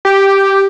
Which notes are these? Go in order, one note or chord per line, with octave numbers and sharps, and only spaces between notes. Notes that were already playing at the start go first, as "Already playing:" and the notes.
G4